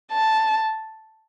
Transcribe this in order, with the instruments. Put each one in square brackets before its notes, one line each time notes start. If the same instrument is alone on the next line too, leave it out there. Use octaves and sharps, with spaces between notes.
[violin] A5